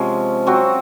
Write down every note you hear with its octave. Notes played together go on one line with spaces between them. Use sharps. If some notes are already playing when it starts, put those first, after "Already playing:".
Already playing: C3 F3 G#3 C#4
F#3 C4 F#4